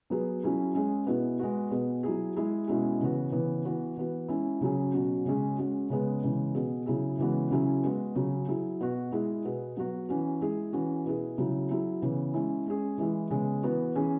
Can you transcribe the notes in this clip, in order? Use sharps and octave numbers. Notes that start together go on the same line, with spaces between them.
F#3 B3 G#4
F#3 C#4 E4 G#4
G#3 C#4 G#4
B2 B3 E4 G#4
G#3 B3 F#4
B2 B3 G#4
F#3 E4 G#4
G#3 E4 G#4
B2 G#3 C#4 E4 G#4
C#3 E3 B3 F#4
C#3 E3 B3
E3 B3 F#4
E3 B3 F#4
G#3 C#4 E4
C#3 F#3 C#4 G#4
B2 F#3 C#4 F#4
C#3 G#3 C#4 G#4
G#3 C#4 F#4
C#3 G#3 B3 G#4
C#3 E3 G#3
B2 B3 G#4
C#3 F#3 E4 G#4
C#3 E3 G#3 B3 F#4
C#3 F#3 C#4 E4 G#4
G#3 B3 F#4
C#3 F#3 C#4
F#3 E4 G#4
B2 B3 F#4
G#3 E4 G#4
B2 B3 G#4
F#3 B3 F#4
E3 C#4 F#4
G#3 E4 G#4
E3 C#4 F#4
B2 B3 E4 G#4
C#3 F#3 E4
F#3 E4 G#4
C#3 E3 B3
G#3 C#4 E4
G#3 C#4 G#4
E3 G#3 E4 G#4
C#3 G#3 B3 G#4
E3 B3 F#4
E3 C#4 G#4